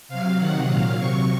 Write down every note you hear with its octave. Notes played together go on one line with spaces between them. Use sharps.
C3 F#3 F5
C3 D#3 F#3 F#5
A#2 F#3 F5
C3 F#3 C#6